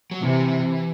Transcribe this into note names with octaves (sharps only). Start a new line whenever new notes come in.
F#3
C3 E3